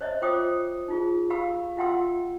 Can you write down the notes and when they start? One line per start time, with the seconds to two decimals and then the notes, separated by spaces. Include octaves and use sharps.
0.01 C5 C#5 D#5 E5
0.22 F4 C5 G5 D6 D#6
0.88 D#4 F4 G#4
1.30 G4 F5 B5 E6
1.77 F4 E5 F#5 G5 C6 E6